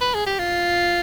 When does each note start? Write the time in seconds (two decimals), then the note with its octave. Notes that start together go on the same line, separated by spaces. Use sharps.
0.01 B4
0.14 G#4
0.26 G4
0.39 F4